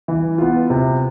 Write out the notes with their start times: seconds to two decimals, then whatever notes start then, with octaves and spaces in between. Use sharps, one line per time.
0.08 E3
0.38 B3 F4
0.70 C3